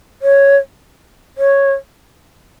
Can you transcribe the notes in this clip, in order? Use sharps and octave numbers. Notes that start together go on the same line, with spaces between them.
C#5
C#5